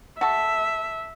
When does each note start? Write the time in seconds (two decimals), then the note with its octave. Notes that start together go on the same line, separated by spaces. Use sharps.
0.21 F#4 A4 E5